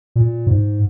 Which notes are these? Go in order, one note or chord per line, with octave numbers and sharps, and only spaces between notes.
A#2
G#2